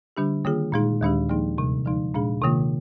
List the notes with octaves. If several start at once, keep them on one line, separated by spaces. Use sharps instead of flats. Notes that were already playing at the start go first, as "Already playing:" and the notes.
D3 G3 D4 G4
D#3 A#3 F4 G#4
A#2 G#3 D#4 G#4
D#2 D#3 G#3 D4 G4
F3 A#3 D#4 G#4
D2 C3 G3
D3 F3 G#3 D#4
A#2 G#3 D4 G#4
C3 D#3 A#3 F4